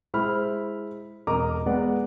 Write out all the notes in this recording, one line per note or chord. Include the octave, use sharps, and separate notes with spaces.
G#3 E4 C5 B5 F6
E1 A#4 D#5 A#5 D6
G#3 B3 B4 D5 F#5